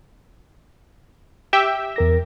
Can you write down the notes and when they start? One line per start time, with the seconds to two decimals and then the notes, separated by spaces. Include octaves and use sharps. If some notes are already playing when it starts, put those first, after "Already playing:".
1.53 G4 E5 G5
1.96 E2 A#4 A#6